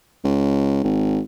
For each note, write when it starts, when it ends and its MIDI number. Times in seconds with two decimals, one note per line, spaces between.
0.24 0.83 37
0.83 1.21 32